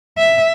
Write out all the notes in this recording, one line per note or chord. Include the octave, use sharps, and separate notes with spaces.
E5